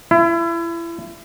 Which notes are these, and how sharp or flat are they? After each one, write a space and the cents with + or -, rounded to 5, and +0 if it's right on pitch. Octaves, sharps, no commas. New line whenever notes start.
E4 +30